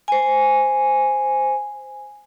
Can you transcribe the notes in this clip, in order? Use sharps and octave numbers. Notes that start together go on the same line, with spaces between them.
C5 G#5